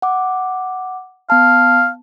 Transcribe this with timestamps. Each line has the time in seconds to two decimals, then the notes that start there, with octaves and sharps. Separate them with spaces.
0.02 F#5 D6
1.30 B3 F5 A5